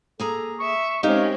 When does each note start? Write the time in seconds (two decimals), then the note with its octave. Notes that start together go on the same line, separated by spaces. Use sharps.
0.20 A#3 G#4 A4 A#5
0.59 E5 C#6
1.03 G#3 C4 C#4 D#4 G4 A#4 F5